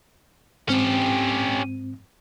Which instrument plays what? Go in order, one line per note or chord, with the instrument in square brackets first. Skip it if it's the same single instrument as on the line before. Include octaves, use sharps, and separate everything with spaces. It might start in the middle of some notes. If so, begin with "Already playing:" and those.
[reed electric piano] G#2 C4 [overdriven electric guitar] C#4 G4